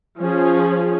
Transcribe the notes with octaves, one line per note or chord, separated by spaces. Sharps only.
F3 C#4 G#4